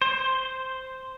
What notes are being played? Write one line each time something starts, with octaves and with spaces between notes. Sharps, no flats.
C5